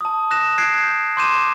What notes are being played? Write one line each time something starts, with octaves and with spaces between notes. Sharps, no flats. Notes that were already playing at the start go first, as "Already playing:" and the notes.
A5 D#6
D#6 F#6 A#6 E7
F#6 G#6 C7 D7
G6
C6 D6 G6 D#7 E7